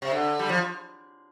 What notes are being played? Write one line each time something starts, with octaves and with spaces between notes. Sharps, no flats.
C3
D3
G3
F3